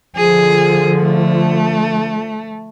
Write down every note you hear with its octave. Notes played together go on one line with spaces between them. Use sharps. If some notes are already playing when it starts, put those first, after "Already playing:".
D3 F3 G#4
A3